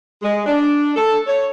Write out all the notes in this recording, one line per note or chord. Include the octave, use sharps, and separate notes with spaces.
G#3
D4
A4
C#5